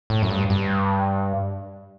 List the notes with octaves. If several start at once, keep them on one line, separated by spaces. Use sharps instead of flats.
A2
F#2
G2
G2